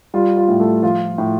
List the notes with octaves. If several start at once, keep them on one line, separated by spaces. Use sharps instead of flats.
G3 F4
F4
A2
A3 A4
F3 F4 F5
A2